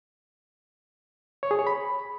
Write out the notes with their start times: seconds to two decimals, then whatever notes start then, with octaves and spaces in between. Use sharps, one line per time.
1.43 C#5
1.51 G#4
1.59 C#5
1.67 B5